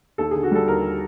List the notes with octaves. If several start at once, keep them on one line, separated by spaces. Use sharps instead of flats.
D#2 A4
D3 G#4
F#4
G3 A4
D#2 A#4